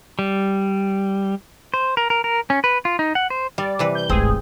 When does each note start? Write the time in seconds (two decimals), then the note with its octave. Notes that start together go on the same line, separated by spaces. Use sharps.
0.19 G3
1.74 C5
1.97 A#4
2.10 A#4
2.24 A#4
2.50 C#4
2.64 B4
2.85 F4
2.99 D#4
3.15 F#5
3.30 C5
3.58 G3 D5
3.79 C3 E3 B4
3.95 G6
4.10 D1 G#1 C4 G#4